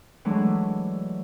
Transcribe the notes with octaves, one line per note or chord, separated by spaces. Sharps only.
E3 F#3 G#3 A3 D4